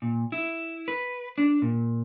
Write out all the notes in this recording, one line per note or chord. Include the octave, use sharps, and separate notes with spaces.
A#2
E4
B4
D4
A#2